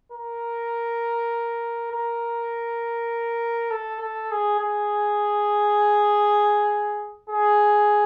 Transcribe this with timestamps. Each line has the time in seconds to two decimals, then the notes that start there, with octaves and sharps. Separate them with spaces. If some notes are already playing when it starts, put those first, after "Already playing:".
0.12 A#4
1.91 A#4
3.71 A4
4.00 A4
4.31 G#4
4.60 G#4
7.30 G#4